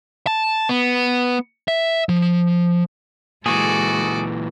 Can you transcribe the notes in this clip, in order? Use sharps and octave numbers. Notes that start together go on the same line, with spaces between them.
A5
B3
E5
F3
A#2 E3 G#3 F#4 G#4 A4 D6